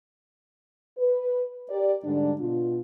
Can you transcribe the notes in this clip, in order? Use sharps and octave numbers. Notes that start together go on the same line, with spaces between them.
B4
G4 A#4 D5
G#2 D3 G3 D4
B2 F4